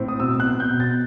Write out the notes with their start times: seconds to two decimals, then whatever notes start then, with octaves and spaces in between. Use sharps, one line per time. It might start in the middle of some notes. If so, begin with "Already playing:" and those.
Already playing: A2 C4
0.08 D#6
0.19 B2 E6
0.40 F#6
0.46 B3
0.60 G6
0.73 B2
0.80 A6